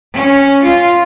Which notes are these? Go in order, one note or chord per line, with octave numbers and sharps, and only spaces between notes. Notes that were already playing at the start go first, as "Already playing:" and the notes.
C#4
F4